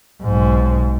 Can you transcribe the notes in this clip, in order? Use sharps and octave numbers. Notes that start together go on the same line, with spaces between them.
B1 G#2